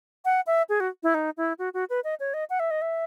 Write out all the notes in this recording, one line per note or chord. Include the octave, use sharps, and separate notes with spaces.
F#5
E5
G#4
F#4
E4
D#4
E4
F#4
F#4
B4
D#5
C#5
D#5
F#5
E5
D#5
E5